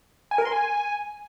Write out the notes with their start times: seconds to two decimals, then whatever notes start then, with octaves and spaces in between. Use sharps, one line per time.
0.31 G#5
0.38 A#4
0.45 C6
0.52 G#5